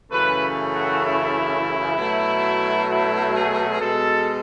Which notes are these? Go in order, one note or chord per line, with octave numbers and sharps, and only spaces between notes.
F#2 C#3 E3 A3 B4
F#4
E4
B2 F#3 A3
E4
G#4
B2 G#3 A4